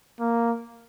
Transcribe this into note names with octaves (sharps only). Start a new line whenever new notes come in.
A#3